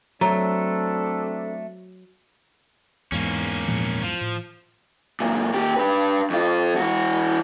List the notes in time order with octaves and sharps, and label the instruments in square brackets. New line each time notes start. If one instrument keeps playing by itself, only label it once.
[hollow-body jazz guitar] F#3 [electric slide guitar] A3 [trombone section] C4 D4 A4 [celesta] A#5
[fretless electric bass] E2 G#2 [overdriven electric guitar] A#3 C#4
[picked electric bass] A#2 F3 G#3
[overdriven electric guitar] F3
[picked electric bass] A2
[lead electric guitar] F#2 A#2
A#2 G4
D4 B4
F2 F4
E3 F#4